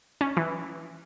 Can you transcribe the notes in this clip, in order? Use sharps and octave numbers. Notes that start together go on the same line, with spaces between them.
C#4
E3